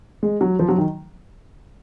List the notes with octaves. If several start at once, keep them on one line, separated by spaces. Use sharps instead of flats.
G#3
F#3
F3
F#3
D#3